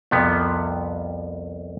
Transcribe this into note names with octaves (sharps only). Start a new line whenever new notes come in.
C2 F2 C3 F3 B3